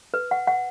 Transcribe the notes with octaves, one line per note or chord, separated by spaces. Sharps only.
B4
F#5
F#5